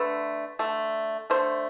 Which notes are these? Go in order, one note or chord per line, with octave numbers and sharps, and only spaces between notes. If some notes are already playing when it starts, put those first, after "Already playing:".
Already playing: D3 A3 B4
D3 A3
D3 A3 C5